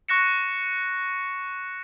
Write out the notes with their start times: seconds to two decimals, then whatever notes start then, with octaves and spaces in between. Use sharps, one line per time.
0.09 C#6 F#6 A#6 C#7 E7